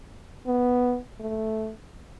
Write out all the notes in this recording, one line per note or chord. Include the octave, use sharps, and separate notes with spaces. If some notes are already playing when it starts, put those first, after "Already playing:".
B3
A3